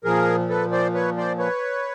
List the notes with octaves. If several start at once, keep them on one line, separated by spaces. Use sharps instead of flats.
A#2 F3 G#4 A#4
A4 B4
C5 D5
B4 C#5
C5 D5
B4 C#5